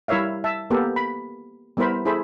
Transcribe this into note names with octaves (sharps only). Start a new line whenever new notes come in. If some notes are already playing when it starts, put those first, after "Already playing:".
G3 E4 A#4 C#5 E5 F5
E5 A5
A#3 B3 G4 A4 A#4
B5
G3 B3 E4 A#4 C5 B5
E4 G#4 A4 C5 B5